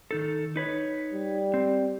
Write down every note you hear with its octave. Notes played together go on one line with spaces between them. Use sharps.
D#3 D#4 A4
D#4 B4 C#5
G3
C4